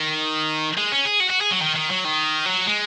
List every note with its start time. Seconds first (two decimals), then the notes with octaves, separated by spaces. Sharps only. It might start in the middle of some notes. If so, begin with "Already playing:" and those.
Already playing: D#3
0.77 G#3
0.92 C#4
1.05 G#4
1.20 F#4
1.30 F#4
1.41 G#4
1.51 F#3
1.61 D#3
1.76 D#3
1.90 F#3
2.04 D#3
2.46 F#3
2.67 G#3